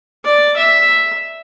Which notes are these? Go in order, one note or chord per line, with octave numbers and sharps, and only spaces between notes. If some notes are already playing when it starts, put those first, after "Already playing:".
D5
E5